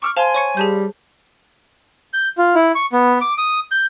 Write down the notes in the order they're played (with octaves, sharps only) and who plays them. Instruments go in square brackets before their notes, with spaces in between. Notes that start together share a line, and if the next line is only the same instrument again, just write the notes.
[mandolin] C#6 E6 F6 [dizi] D6
[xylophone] C5 A5 F7 [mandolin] F5 C6 [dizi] G#5
[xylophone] C#5 C#6 C#7
[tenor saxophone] G3 [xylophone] G#4 A5 G6
[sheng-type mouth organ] G6
F4
E4
C#6
B3
D6
D#6
G6